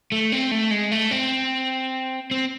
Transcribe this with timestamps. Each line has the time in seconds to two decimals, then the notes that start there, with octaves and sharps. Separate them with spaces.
0.12 A3
0.32 C4
0.51 A3
0.71 G#3
0.92 A3
1.11 C4
2.31 C4